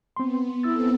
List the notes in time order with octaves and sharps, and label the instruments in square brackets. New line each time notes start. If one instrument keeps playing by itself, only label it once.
[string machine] B3 [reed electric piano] C4 C6
[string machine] B3 C4 A4 [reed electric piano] E4 E6 A6